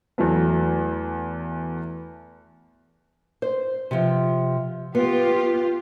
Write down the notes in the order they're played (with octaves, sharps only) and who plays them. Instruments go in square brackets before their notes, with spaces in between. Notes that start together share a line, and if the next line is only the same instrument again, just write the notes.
[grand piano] E2 F#3 A3 B3
[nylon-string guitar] C5
C3 F3
[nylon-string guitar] B3 [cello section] F4 G4